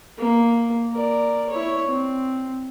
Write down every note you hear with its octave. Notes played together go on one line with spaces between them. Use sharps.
A#3
A#4 D5
E4 C#5
C4